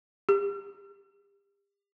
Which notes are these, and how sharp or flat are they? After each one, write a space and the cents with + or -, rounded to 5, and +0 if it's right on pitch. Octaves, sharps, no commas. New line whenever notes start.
G4 +35